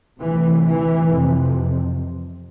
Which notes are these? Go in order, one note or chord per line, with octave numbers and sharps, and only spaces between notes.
D2 C3 E3
E3
F2 C3